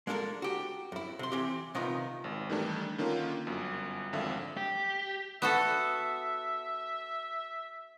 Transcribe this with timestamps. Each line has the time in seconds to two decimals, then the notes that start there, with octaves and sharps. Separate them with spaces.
0.07 G#3 A#3 D4 E4 A4 A#4
0.42 F#4 G4
0.92 F#2 E4
1.19 C3 C6
1.32 E3 C4 G4
1.75 C3 D#3 B3 D#4 F4
2.24 G#1
2.50 D#3 E3 G3 A3 D4
2.98 D3 D#3 A#3 C#4 F4
3.47 G1 F#2
4.13 G#1 F2 D3 E5 F5
4.57 G4
5.42 B3 F#4 A4 E5